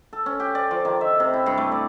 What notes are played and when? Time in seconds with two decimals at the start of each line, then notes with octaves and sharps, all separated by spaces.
0.13 A4
0.26 C#4
0.40 G4
0.55 D5
0.71 F3
0.85 D#3
1.01 E5
1.20 C3
1.33 E4
1.46 G2
1.58 A3
1.72 D5